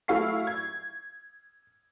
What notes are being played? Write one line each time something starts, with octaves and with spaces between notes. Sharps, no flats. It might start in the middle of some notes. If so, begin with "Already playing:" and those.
F#3 A3 E4 F5 C#6 C7
G#6